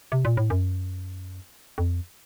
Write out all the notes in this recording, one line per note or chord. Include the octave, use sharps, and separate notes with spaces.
C3
A#2
A2
F#2
F2